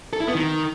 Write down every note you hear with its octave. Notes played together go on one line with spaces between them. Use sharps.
A4
E4
B3
D#3